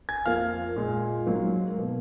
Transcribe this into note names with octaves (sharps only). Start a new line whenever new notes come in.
G#5 G#6
F2 F3 A#3 F5 F6
A#2 G#3
G#2 F#3 A#3
B2 A#3